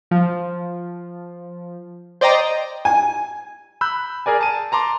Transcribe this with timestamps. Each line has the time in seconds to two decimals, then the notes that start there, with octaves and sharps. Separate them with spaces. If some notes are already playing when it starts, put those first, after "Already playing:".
0.11 F3
2.21 C5 D5 D#5 G5 A#5
2.85 G#5
3.81 B5 E6 F#6 G6
4.26 G#4 A#4 D5 G#5
4.41 A5 D#7
4.72 A5 A#5 C6 D6